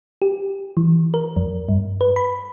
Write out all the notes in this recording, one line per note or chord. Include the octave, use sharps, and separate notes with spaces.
G4
E3
A#4
F2
G2
B4
B5